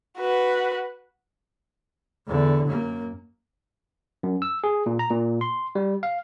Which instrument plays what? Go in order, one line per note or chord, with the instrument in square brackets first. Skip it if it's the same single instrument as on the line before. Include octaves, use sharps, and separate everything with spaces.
[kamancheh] F#4 B4
[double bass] E2 D3
F#2 A#3
[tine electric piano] F#2
E6
G#4
A#2
A#5
A#2
C6
G3
F5